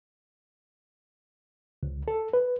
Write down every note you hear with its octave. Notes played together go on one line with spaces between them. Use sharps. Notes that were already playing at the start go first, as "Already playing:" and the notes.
C#2
A4
B4